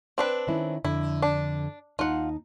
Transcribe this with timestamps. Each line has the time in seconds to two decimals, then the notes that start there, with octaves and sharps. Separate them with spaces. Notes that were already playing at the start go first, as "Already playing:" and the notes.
0.18 C4 D4 B4
0.48 D#3 C#4 E4
0.85 F2 D3 E4
1.22 D4
1.99 D#2 D#4 F4 F#5 A5